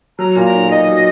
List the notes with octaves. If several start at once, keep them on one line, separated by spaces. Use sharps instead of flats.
F#3 A#5
A#2
A#5
B1
B1 D#5
F#3